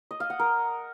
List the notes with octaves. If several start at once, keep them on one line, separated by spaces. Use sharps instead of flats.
D#5
F5
F#5
A#4